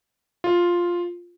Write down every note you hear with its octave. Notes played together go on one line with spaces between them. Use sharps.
F4